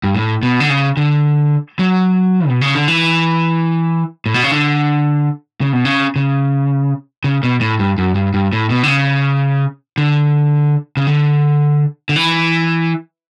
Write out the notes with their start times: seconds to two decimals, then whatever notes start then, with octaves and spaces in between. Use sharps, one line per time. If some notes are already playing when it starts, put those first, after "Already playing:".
0.04 G2
0.15 A2
0.43 B2
0.60 D3
0.70 C#3
0.97 D3
1.79 F#3
2.48 B2
2.61 C#3
2.75 D3
2.88 E3
4.26 A2
4.34 B2
4.43 C#3
4.51 D3
5.61 C#3
5.73 B2
5.85 C#3
6.16 C#3
7.24 C#3
7.43 B2
7.61 A2
7.79 G2
7.98 F#2
8.15 G2
8.34 G2
8.53 A2
8.70 B2
8.83 D3
8.88 C#3
9.98 D3
10.97 C#3
11.07 D3
12.09 D3
12.16 E3